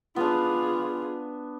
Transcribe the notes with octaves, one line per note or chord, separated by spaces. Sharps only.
B3 D4 F4 G#4